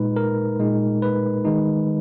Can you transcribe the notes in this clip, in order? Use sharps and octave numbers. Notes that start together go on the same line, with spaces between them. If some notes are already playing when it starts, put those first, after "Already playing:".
Already playing: A#2 G#3 D#4 B4
A#4
A#2 G#3 D#4
B4
D#3 G#3 D#4